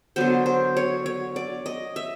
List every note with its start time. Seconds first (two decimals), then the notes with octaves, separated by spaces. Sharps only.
0.16 D3 F#3 B3 C5
0.46 C5
0.77 C#5
1.06 C#5
1.36 D5
1.66 D#5
1.96 E5